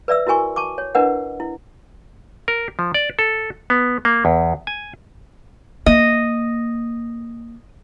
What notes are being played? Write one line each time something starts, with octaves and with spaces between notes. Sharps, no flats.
B4 D5 E5 E6
E4 F#4 A#4 G#5 C#6
A5 C#6 D6
C#5
D4 E4 A#4 B4 D#5 F#5
E4
A#4
F3
D5
A4
B3
A#3
E2
G#5
A#3 D#5